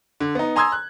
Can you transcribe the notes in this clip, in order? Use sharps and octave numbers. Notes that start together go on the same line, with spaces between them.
D3
B3 D#4
G#5 A#5 C6 D#6 E6 G#6
F#6